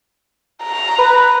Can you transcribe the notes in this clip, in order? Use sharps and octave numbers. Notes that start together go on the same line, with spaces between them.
A#5
B4